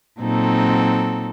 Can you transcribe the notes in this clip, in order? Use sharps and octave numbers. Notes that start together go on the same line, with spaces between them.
A#2 F#3 C4 D#4 A4